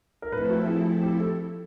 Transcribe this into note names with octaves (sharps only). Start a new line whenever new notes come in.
A#4
F3 A3 C4 E4 A4 B4
F#4
G#4
G4
A4